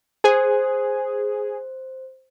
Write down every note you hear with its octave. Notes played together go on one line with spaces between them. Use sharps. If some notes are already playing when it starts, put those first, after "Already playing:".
G#4 C5